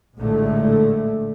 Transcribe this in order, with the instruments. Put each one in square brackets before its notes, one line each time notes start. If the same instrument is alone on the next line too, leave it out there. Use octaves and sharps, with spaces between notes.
[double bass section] A#1 A2 D3 G#3 A3